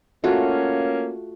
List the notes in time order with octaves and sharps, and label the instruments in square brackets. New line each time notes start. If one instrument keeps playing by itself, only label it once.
[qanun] A3 F4 F#4 [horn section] A#3 C#4